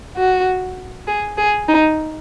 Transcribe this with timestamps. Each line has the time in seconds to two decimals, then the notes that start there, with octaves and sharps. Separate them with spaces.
0.16 F#4
1.07 G#4
1.37 G#4
1.68 D#4